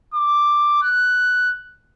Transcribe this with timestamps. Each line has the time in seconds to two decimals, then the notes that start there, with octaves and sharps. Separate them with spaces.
0.14 D6
0.83 F#6